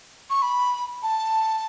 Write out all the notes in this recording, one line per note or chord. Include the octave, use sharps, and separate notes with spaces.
C#6
B5
A5